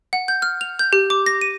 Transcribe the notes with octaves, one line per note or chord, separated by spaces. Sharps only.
F#5
G6
F6
F7
G6
G4
D6
A#6
D#7